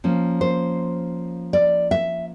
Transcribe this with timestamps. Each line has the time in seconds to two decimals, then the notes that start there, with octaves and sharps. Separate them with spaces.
0.04 F3 A#3 C#4
0.41 C5
1.53 D5
1.91 E5